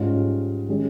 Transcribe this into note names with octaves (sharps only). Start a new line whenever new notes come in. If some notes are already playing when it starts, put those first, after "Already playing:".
Already playing: G#2 G3 C#4 F4
D#3 G#3 C#4 G4